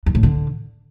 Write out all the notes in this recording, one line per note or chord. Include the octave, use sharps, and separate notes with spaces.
F#2
A2
D3